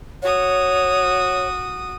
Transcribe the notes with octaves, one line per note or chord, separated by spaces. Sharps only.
F#4 C#5 D#6